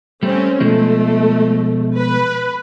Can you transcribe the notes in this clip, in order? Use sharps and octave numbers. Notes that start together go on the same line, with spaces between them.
G3 A3 C4 C#4
B2 F3 G#3 A3
B4